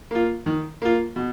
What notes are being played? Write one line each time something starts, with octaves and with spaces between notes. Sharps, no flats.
A#3 F4
D#3
A#3 F4
B2